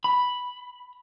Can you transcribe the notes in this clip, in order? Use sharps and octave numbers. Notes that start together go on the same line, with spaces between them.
B5